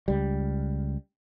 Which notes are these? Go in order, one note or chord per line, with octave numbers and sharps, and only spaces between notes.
C#2 G3